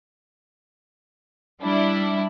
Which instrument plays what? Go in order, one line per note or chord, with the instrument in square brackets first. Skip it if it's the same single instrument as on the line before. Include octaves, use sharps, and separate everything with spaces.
[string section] G3 D4 E4